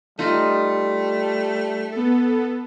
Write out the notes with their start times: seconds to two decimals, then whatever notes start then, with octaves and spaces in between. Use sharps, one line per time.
0.19 G3 A3 D#4 F4
1.92 B3 A4